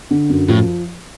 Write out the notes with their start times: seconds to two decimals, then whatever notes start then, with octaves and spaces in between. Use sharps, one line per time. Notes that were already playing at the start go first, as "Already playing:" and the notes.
0.11 D3
0.29 F#2
0.48 A2 F3